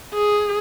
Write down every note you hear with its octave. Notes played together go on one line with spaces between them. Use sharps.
G#4